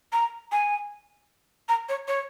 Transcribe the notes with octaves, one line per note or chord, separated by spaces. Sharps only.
A#5
G#5
A#5
C#5
C#5